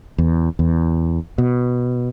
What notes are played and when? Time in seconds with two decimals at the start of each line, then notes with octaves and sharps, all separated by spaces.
0.18 E2
0.59 E2
1.38 B2